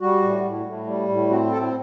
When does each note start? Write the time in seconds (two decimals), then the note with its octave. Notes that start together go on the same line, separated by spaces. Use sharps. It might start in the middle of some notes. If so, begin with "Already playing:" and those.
0.01 G3 F#4
0.22 A2
0.44 A2
0.66 A2
0.87 G3
1.09 A2
1.30 C4 F#4
1.51 A2 A4